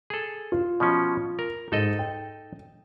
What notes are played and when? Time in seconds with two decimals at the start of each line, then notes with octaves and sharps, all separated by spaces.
0.10 G#4 A4
0.52 F4
0.80 B2 F3 C#4
1.39 A#4
1.72 G#2 D#4 A4 D#5
1.99 G5